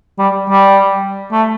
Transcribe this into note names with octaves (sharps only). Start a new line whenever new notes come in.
G3
G3
A3